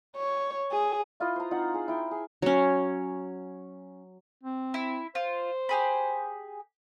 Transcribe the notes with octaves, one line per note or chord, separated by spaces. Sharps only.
C#5
G#4
E4 F4 B4 D#5
C5 A#5
C4 D#4 F4 F#5
G#4
E4 G5 C6
G#4
F#3 C#4
C4
E4
F4 C5
G4 G#4 B5